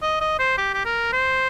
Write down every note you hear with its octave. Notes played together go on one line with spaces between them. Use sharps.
D#5
D#5
C5
G4
G4
A#4
C5